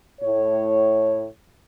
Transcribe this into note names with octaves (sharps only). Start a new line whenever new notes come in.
A2 C#5